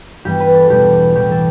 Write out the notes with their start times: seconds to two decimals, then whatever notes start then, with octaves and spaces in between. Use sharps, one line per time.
0.25 G2 E3 G3 B3 G4
0.40 B4
0.55 A4
0.70 E2 B2 G3 B3 G4
1.15 A2 E3 G3 G4
1.31 A4